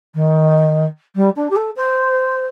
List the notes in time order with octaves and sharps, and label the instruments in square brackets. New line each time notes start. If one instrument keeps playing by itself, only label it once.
[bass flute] D#3
G3
D4
G4
A4
C5